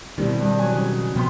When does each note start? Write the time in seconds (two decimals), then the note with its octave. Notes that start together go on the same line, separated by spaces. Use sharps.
0.18 B2 D#3 G3 C4 E4
0.40 G2 G3 D#5
0.59 F#3 G#5
0.75 C#3
1.16 B2 F3 B3 G5 C6